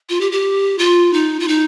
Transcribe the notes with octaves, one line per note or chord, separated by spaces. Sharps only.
F4
G4
G4
F4
D#4
F4
D#4